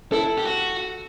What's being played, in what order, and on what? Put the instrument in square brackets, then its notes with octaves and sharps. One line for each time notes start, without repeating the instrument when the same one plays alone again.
[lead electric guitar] E4 [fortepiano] A4
[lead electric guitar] G4
F#4